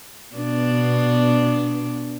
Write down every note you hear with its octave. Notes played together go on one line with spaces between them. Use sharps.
B2 B3 D4